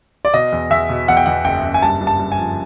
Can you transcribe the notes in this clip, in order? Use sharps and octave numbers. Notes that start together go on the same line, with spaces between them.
D5
B2 D#5
E2
E2 E5
B2
E2 F#5
G5
E2 F#5
F#1 G5
F#1
G#5
G2 A5
G2
A5
G2
G#5
F3